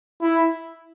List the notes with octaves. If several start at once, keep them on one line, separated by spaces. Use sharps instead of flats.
E4